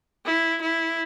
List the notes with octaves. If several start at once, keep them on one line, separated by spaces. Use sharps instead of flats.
E4
E4